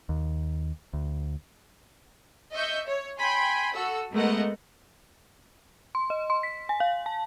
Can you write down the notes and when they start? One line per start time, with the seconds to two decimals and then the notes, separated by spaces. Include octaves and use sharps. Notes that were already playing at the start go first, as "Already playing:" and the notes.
0.09 D#2
0.93 D2
2.52 D#5 E5 C#6 G6
2.86 C#5
3.18 G5 G#5 B5 C6
3.73 F#4 A4 E6
4.12 G#3 A3 B3 A#4 D#5 F#5
5.95 C6
6.10 D#5
6.30 C6
6.43 B6
6.69 G#5
6.80 F5
7.06 A5